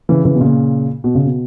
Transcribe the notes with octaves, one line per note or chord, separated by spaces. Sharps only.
C#3 E3
C#3 E3
B2
A#2 C#3
B2
C#3
B2